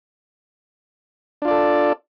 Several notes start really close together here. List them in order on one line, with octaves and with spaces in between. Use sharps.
D4 F4 D5 A4